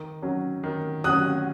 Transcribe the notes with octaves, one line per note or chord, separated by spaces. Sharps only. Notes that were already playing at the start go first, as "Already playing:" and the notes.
Already playing: D#3
F#3 C#4
D#3
F#3 C#4 D#6 F#6